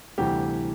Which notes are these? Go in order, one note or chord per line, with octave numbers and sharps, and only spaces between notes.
D2 C3 E3 G3 G4